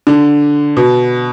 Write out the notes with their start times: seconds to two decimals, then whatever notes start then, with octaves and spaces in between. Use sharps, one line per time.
0.07 D3
0.77 B2